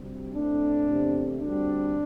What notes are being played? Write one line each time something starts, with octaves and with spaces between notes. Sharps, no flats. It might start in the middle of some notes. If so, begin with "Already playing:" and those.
Already playing: D2 C3 G3 C4
A2 A3 C4 D4
E2 C3 A3 C4
D2 D3 G3 C4 D4